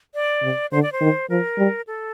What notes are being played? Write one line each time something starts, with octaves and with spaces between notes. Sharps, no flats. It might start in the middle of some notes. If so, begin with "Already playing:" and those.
D5
C3
D3 C5
D5
C5
D#3
F3 A#4
G3
A4